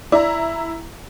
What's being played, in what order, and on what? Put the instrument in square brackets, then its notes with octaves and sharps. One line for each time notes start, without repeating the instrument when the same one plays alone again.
[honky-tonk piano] E4 A#5 [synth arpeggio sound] D5